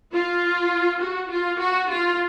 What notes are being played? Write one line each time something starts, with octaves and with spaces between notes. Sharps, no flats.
F4
F#4
F4
F#4
F4